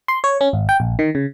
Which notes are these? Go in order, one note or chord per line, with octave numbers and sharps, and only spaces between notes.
C6
C#5
C#4
G#1
G5
A#1
D#3
C#3